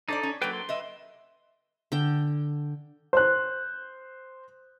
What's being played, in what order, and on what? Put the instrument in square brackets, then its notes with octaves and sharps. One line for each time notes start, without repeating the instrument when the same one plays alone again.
[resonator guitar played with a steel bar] D4 C5 D5 [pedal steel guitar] D#4 A4
[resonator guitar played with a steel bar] C#4
[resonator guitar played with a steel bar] F#3 A#3 A4 [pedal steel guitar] B4 G5
[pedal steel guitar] C6
[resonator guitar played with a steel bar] B4 D#5 E5
[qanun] D3 G5
[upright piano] C5 F#6